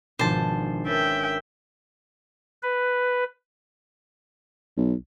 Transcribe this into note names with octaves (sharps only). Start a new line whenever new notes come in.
G#1 B2 F3 D4 C5 A5
C#4 A#4 B4 E5 G5 A6
B4
B1